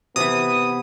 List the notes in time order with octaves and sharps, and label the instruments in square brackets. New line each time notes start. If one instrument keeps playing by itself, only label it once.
[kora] C3 E3 [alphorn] B3 [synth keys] D#6